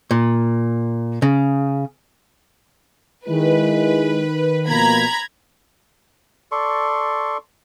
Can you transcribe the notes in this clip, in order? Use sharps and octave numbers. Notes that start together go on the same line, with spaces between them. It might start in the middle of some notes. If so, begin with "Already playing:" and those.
A#2
C#3
D#3 G#3 E4 B4
B2 F3 A#3 A#5 B5 G#6
A4 D5 C6 C#6